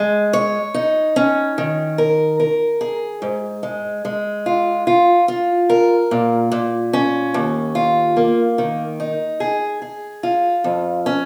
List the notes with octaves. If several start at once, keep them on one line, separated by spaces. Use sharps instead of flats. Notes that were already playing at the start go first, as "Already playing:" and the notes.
Already playing: G#3
C#5
D#4
C#4
D#3
A#4
A#4
G#4
G#2
G#3
G#3
F4
F4
F4
A#4
A#2
A#2
C#4
D#2
F4
A#3
D#3
D#4
G#4
G#4
F4
F2
C#4